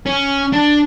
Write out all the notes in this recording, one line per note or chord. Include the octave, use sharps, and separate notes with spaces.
C#4
D4